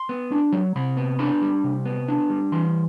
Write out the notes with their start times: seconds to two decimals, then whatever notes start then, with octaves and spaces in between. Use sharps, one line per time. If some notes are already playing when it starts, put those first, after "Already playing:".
Already playing: C6
0.09 B3
0.31 D4
0.52 F#3
0.76 C3 B5
0.97 B3
1.19 D4 B5
1.42 G3
1.64 C3
1.85 B3
2.08 D4
2.30 G3
2.52 E3 C6